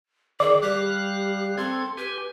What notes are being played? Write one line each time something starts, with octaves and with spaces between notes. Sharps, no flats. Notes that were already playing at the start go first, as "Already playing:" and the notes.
D#3 G#4 D5
G3 G4 F5 F#6
C4 A4 C6 G#6
G4 B4 G#5